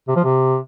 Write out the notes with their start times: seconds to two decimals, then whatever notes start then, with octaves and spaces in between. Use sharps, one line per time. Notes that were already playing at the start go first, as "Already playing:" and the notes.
0.08 C3
0.16 F3
0.24 C3